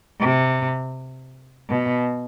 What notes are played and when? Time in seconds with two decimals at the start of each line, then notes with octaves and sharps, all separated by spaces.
0.20 C3
1.70 B2